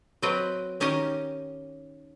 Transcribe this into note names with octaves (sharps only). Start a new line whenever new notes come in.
F#3 C4 B4 D#5 G5
D#3 C#4 D#4 G4 D#5